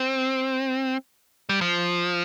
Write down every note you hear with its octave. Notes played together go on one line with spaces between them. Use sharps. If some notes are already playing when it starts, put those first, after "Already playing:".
Already playing: C4
G3
F3